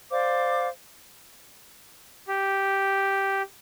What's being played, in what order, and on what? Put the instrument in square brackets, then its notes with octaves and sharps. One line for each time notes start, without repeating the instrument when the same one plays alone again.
[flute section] C5 D5 F5 D6
[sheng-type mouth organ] G4